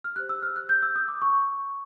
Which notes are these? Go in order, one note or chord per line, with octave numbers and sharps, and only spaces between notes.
F6
G4 C5 F#6
E6
F6
F#6
G6
E6
D#6
D6
C#6